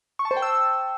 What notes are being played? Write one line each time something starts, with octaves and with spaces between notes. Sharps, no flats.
C#6
A5
C5
G5
E6